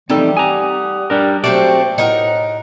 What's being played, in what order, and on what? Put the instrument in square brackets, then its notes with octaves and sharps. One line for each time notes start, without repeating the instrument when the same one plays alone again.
[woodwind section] E3 F3 A3 [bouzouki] G3 [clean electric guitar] C4 D#4 A4
[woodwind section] G4 F#5 D#6 [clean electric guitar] G#5 A#5
[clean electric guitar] G3 D4 A#4
[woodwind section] F#3 F#4 G4 [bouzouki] A3 C4 C5 [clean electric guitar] D5
[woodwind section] A2 [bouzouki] D#4 A#4 F#5